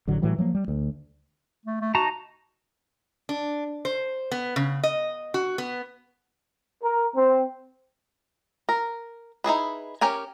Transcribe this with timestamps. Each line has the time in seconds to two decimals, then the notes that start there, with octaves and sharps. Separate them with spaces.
0.07 A1 D3 F#3
0.22 A2 E3 F#3 G3
0.39 F3 F#3 A#3
0.55 G3
0.68 D2
1.66 A3
1.81 A3
1.95 D#4 F#4 A5 A#5
3.29 D4
3.85 C5
4.32 B3
4.56 C#3
4.83 D#5
5.34 F#4
5.58 B3
6.83 A#4
7.15 C4
8.69 A#4
9.44 D#4 E4 G#4 B4
10.01 C#4 G4 A#4 G#5